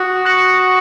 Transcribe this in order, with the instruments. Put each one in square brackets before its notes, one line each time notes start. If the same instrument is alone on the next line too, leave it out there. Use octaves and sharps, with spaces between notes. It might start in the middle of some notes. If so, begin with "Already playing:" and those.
Already playing: [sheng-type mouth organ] F#4 [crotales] D#6
[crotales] C#6 F#6 A#6 C#7 F#7